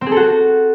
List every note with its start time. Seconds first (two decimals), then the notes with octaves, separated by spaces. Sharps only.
0.01 C4
0.06 G#4
0.11 A4
0.17 F#4